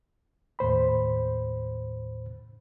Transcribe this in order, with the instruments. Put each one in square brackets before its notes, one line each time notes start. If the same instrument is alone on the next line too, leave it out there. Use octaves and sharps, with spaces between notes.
[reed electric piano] D#2 A2 C5 B5